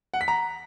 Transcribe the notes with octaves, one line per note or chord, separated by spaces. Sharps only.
F#5
B6
A#5